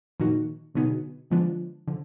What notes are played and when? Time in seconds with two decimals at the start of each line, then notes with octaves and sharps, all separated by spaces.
0.20 A#2 D#3 F3 A#3 D#4 F#4
0.75 B2 D3 F#3 B3 D#4 G#4
1.31 D3 F3 G#3 B3 D4
1.88 D3 F3